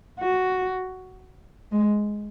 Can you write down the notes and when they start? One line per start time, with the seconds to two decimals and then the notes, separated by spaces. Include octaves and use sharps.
0.20 F#4
1.72 G#3